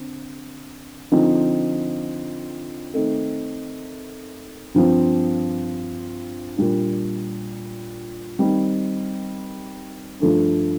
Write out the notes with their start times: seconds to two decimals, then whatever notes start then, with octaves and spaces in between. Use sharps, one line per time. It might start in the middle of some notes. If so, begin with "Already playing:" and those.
Already playing: D3 C4
1.12 D3 F3 C4 D#4
2.93 D#3 A3 C4 D#4
4.74 G2 F3 C4
6.57 A#2 G3 D4
8.39 D#3 G3 C4 D#4
10.20 G2 F3 A3 D4